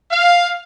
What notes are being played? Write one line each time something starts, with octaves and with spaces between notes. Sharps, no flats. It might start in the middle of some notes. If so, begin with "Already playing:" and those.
F5